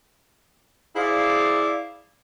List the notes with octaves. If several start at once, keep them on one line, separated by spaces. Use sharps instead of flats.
E4 G#4 C5 D5 F5